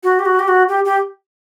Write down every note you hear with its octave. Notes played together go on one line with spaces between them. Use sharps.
F#4
G4
F#4
G4
F#4
G4
G4